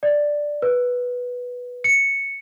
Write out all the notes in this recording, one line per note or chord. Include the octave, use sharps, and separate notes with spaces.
D5
B4
C#7